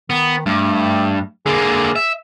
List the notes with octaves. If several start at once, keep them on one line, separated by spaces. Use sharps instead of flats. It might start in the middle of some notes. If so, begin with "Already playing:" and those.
D#3 B3
G2 A3
D3 A#3 G#4
E5